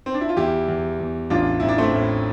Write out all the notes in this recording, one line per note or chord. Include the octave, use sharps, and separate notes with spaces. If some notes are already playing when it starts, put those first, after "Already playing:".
C4
D4
E4
F4
E2 E4 G4
E2
E2
A1 D4 F4
A1 E4
D4
A3 C4
A2